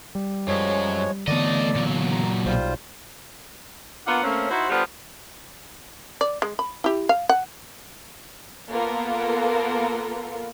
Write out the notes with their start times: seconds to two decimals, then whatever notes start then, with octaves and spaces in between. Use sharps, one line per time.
0.15 G3
0.48 F#2 F3 G#3 C#5
1.28 D3 E3 A3 B3 D5 D#5
1.75 A#2 F#3
2.11 A#5
2.46 B1 G3 F4 C5
4.07 A#3 B3 D4 F4 F#5
4.23 A3 A#3 C4 C#4
4.50 D#4 E4 F#4 C5
4.70 D3 G3 B3 D4 F4 C5
6.21 D5
6.42 G#3
6.59 B5
6.84 E4 G4
7.09 F5
7.29 F#5
8.70 A#3 B3 F4 A4 A#4